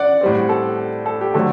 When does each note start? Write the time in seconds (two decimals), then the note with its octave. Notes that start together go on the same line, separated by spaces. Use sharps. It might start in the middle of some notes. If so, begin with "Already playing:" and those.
Already playing: D5 F#5
0.21 A2 G3 C4
0.49 A4
1.06 A4
1.21 G4
1.34 D3 F#3 A3 C4 A4